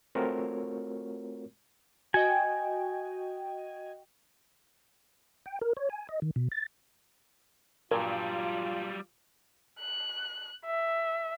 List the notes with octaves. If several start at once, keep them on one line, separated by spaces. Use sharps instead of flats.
A3 C4 F4 F#4 A#4 C#5
F#4 D#5 G5 G#5
G5
A#4
C#5
G#5
D#5
D#3
B2
A6
G2 A#2 F#3 G3 F4 A#4
F#6
E5